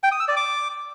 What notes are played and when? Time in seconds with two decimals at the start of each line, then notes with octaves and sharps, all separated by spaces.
0.03 G5
0.12 D#6
0.20 E6
0.28 D5
0.36 D6